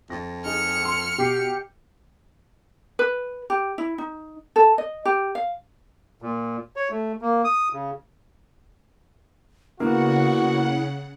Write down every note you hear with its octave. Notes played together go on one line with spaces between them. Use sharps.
F2 A6 A#6
D#4 G#4 F6 C#7
C6 E6
B2 G4 C7
B4
G4
E4
D#4
A4
D#5
G4
F5
A#2
C#5
A3
A#3
D#6
C#3
C#3 A#3 B3 E4 F#4 F#5